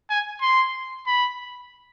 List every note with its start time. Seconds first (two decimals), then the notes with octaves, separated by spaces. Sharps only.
0.10 G#5
0.42 C6
1.07 B5